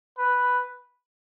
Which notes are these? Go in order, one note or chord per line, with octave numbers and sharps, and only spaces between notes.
B4